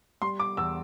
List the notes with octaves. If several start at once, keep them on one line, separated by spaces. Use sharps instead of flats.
G3 C6
D6
E2 E6